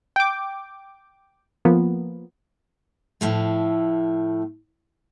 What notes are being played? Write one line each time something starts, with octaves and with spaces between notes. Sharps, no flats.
G5 D6
F3 A#3 B3
A2 F3 A3